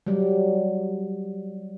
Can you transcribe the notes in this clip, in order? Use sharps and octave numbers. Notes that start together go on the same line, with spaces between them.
F#3 G3